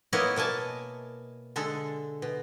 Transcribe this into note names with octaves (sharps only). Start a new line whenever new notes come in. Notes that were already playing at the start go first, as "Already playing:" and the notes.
A#3 B3 E4 C#5 D#5
B2 A#3 G#5 A5
D3 G#3 A4
B2